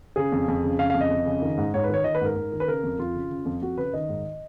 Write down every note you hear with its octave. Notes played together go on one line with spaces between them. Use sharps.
C#3 G#4
F2
F2
C#3
C#3 F5
F2 F5
D#5
F2
C#3
D#3
G#2
G#2 C#5
B4
D#3 C#5
D#3 D#5
B4
G#2 A#4
G#2
D#3
B4
C#3 A#4
F2
F2 F4
C#3
C#3
F2
F2 F#4
C#3 B4
D#3 D#5
G#2